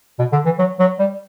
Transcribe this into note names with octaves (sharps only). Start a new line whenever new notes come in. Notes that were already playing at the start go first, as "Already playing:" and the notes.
B2
D3
E3
F#3
F#3
G3